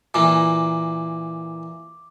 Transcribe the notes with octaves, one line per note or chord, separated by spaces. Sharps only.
A#2 E3 A#3 D6